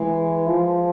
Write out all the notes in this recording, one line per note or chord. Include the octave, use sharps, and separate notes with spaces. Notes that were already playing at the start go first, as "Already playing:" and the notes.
Already playing: E3 G#3
F3